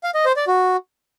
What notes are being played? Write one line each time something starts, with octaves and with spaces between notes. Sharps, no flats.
F5
D#5
C5
D5
F#4